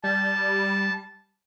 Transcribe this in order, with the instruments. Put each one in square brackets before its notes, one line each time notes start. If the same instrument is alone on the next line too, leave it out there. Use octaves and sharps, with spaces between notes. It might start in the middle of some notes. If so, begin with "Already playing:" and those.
[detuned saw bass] G3 [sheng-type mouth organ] A5